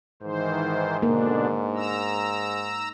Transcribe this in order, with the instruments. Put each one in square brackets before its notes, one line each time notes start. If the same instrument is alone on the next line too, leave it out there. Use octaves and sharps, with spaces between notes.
[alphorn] G#2 [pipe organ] D#3 E3 C5
[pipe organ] B2 D3 D4 [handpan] A#3 A#4
[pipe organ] A#5 E6